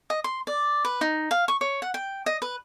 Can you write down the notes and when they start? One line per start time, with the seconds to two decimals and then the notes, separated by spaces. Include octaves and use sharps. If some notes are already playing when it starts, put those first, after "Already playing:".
0.10 D#5
0.24 C6
0.47 D5
0.85 B4
1.01 D#4
1.31 F5
1.48 C#6
1.61 C#5
1.82 F#5
1.94 G5
2.26 D#5
2.42 B4